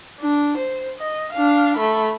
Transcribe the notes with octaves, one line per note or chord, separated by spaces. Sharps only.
D4
C5
D#5
D4 F5
A3 B5